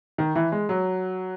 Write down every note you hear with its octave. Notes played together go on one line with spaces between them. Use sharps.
D#3
E3
G#3
F#3